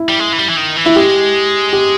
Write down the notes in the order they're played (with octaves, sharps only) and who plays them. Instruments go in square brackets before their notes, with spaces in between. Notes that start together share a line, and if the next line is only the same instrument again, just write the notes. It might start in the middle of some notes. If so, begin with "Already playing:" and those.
Already playing: [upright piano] E4
[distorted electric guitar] G3
G#3
E3
G3
E3
D#3
E3
[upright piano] E4
[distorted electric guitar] G#3 [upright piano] G4
[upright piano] G4